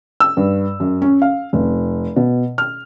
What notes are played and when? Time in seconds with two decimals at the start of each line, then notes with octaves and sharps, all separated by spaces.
0.20 E6
0.37 G2
0.80 F#2
1.02 C#4
1.22 F5
1.53 F1
2.16 B2
2.58 F6